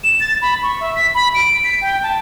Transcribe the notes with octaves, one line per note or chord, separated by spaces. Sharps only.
E7
A6
B5
C#6
E5
B6
B5
D7
B6
G5
A5